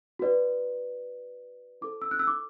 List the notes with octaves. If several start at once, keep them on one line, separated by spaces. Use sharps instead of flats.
F#4 B4 D5
E4 A4 C5 D6
E6
F#6
E6
D6